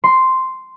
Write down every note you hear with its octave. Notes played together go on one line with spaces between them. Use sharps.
C6